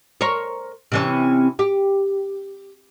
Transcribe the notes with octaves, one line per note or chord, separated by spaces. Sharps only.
A#4 C5 C#5
C3 E3 C#4
G4